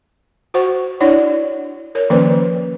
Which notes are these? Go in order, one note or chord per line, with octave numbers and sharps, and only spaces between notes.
F#4 C5 F#5 C#6
D4 E4 C#5 D5 F#5
A#4 C#5
D#3 F3 A#3 C#4 B4 C5